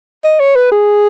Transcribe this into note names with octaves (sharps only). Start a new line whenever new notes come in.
D#5
C#5
B4
G#4